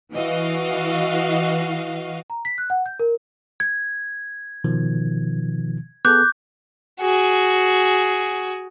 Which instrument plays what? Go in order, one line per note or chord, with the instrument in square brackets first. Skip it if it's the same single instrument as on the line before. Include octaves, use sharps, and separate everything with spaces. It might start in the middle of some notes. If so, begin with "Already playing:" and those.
[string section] E3 F#4 D#5 F5
[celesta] A#5
B6
F#6
F#5
G6
A#4
[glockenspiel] G#6
[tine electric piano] B2 D#3 F3
[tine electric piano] B3 G#4 A4 [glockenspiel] D6 F#6 G6
[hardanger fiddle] F#4 G#4